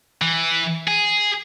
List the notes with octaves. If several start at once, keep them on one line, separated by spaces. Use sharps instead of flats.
E3
G#4